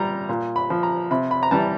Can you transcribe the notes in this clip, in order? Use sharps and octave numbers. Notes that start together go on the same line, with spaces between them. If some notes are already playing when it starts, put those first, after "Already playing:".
Already playing: A#2 G3 A#5
A#2
B5
F3
A#5
C3 B5
B5
A#5
E3 G3 A5